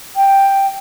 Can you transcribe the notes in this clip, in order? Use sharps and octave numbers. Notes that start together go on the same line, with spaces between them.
G5